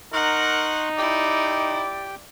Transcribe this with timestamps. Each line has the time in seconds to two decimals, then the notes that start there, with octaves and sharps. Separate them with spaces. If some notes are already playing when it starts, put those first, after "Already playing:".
0.13 D#4 A#4 F#5 C6 C#6 F#6
0.98 E4 G4 D5 G5